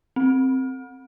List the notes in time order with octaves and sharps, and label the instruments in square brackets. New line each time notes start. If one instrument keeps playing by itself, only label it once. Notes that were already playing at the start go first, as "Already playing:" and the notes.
[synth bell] C4